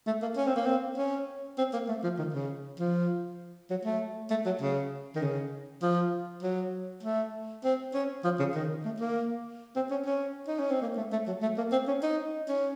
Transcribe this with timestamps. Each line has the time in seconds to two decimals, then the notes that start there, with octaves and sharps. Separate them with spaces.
0.07 A3
0.22 A#3
0.37 C#4
0.47 C4
0.56 A#3
0.66 C4
0.97 C#4
1.58 C4
1.73 A#3
1.88 A3
2.03 F3
2.18 D#3
2.34 C#3
2.79 F3
3.70 F#3
3.85 A3
4.30 A3
4.46 F#3
4.61 C#3
5.16 D#3
5.21 C#3
5.82 F3
6.43 F#3
7.03 A3
7.64 C4
7.94 C#4
8.24 F3
8.39 C#3
8.54 D#3
8.85 A3
9.00 A#3
9.76 C4
9.91 C#4
10.06 C#4
10.48 D#4
10.59 C#4
10.71 C4
10.82 A#3
10.97 A3
11.12 A3
11.27 F#3
11.42 A3
11.58 A#3
11.72 C4
11.87 C#4
12.03 D#4
12.49 C#4